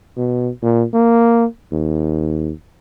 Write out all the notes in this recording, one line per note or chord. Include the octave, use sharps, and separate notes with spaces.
B2
A#2
A#3
D#2